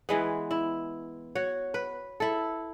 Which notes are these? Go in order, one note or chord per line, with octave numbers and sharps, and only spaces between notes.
E3 G#3 B3
E4
F#4 C#5
B4
E4 A4